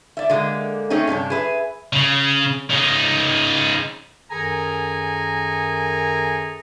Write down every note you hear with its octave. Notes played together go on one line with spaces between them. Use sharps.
D5 E5
D3 G#3 A#3
A3 C4 C#4 D#4 G#4
G2 C3 C#4 D4
G#4 B4 E5
C#3
C#3 D#4
F#2 D#3 G#4 A4 G#5 A#5